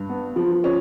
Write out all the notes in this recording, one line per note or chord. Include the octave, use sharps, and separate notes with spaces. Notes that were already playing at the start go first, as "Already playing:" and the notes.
Already playing: G2
B3
F3
C#4